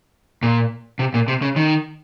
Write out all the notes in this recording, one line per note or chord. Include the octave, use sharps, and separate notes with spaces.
A#2
C3
A#2
C3
C#3
D#3